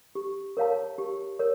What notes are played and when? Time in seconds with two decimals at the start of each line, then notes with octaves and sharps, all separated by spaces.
0.15 G4
0.57 A#4 C#5 F5 A5
0.98 G4
1.39 A#4 C#5